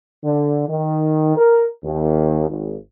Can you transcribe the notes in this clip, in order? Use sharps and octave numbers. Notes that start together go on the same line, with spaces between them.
D3
D#3
A#4
D#2
G#1